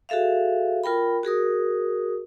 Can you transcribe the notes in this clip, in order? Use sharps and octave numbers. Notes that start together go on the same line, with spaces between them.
F#4 G#4 A4 E5 F5
F4 A#4 G5 B5
F#4 G#4 A#4 D#6